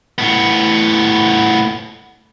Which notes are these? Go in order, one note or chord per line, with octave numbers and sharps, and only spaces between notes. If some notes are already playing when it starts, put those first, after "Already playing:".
A2 B3